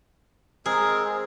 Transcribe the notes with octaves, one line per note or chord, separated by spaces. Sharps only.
G#3 C4 G#4 A#4